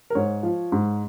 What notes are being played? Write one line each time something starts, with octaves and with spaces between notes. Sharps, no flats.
A#4
G#2 C#5
F3
G#2